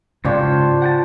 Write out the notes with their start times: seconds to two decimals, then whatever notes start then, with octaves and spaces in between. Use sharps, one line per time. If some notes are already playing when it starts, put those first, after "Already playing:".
0.25 G#2 C#3 D4 F4 G4 C5 C#5
0.82 F#5 G5 A5